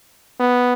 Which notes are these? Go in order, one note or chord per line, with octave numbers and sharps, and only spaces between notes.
B3